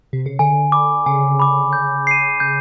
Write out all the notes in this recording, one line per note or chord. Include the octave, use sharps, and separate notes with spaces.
C3
C#3
D3 G#5
B5 D6
C#3 G#5
B5 D6
G6
C7 D#7
C#3 G6